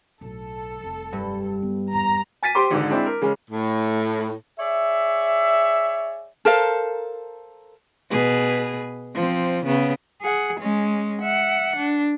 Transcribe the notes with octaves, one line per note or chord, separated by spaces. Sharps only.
B1 A2 A4
F1 G3
G2
B3
E2 G#2 A#5
G#5 A6 B6 D#7
G4 C5 C6 D6
G#1 G#2 D3
G#3 C4 D4 E4
A#4
C#3 G#3 C#4
A2
G#4 C#5 D5 E5
A4 A#4 C5 F5
B2 G#4 B4
F3 C4
C#3 B3
G#4 F#5
G#3 C#4
E5 F#5
D4